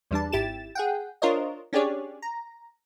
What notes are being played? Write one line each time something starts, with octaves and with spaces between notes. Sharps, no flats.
E2 G3 D4 A5
G#1 E4 G4 A6 E7
G#4 F#5 G5
D4 F4 A#4 C5 C#5 D#5
C#4 D4 G4 G#4 C#5 D5
A#5